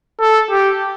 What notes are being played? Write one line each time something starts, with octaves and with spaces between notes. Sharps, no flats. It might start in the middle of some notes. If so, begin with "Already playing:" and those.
A4
G4